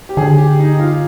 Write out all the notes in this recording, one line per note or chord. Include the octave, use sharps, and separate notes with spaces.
G4
D3 G#4
G4
D#4
D#4
F4